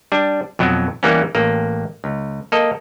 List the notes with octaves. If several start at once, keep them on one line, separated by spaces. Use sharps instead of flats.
G3 D4
F2 B2 F#3
E3 G3 A#3 B3 C#4
A1 A#3
C#2
A#3 A4 D#5